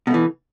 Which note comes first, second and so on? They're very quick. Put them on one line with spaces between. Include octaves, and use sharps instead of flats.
B2 A3 E3